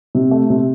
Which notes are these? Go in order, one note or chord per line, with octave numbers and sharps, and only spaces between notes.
C3
A3
C3